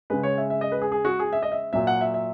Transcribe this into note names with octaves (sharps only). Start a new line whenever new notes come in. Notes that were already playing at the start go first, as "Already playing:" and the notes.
C#3 G#3 B4
C#5
E5
E5
D#5
B4
G#4
G#4
F#4
G#4
E5
D#5
E5
A#2 F#3 E5
F#5
E5
E5